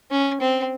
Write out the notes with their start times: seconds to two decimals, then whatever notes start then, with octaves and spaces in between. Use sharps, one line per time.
0.11 C#4
0.41 C4